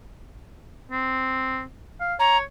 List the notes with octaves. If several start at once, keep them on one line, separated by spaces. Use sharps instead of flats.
C4
F5
C#5 A#5